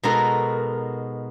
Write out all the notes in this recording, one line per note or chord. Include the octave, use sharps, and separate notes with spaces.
B2 G#3 D#4 F#4 A4 A#4